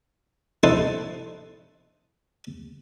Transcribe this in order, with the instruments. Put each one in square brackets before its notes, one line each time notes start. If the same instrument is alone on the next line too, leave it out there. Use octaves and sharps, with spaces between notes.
[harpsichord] D#4 E4 A4 C5 F#5